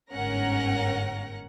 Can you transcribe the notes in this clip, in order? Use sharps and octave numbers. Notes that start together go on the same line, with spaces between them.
G1 G#2 C#4 A#4 F#5 A#6